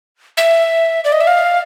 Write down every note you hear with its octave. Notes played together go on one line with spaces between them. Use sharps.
E5
D5
D#5
E5
F5